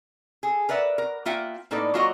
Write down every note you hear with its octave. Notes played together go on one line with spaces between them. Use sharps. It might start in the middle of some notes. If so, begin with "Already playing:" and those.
G#4 A4
A#4 B4 D5 E5 F#5
A#4
A#3 F4 E5 F#5 G5
A2 A#3 D#4 A4 B4 D5
F#3 A#3 F4 F#4 C#5 D#5